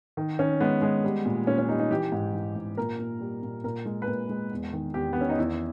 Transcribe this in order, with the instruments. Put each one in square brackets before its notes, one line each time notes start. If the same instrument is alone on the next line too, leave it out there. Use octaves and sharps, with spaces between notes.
[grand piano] D#3
D#3 C#4
G#3 B3
G#3
G3
A#2
A#2 C#4
C#4
G3 D#4
D#4
E3 G4
G#2
E3
G#2
A#2 A#4
A#2
G3
A#2
A#2 A#4
G#3
B4
A#2 A#4
G#3
E2
D#3
E2 G4
B3
D#3 C#4
D#4
E2 E4